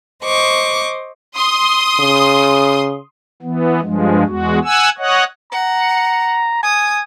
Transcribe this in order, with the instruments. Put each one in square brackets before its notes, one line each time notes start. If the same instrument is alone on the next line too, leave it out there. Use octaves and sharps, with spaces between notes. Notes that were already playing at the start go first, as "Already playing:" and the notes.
[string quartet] C5 D#5 C#6 D6
[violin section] C6 D#6
[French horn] C#3
[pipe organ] E3 B3
G2 F3 G#3
E2 G#3 F#4
F#5 G#5 E6
C#5 D#5 F#5
[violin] F#5 [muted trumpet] A#5
[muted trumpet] G#5 [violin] D#6